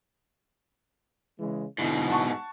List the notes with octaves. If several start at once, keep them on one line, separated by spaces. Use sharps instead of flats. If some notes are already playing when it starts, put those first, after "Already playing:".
C#3 E3 G#3
G#2 B2 D3 E4
F#5 A5 C#6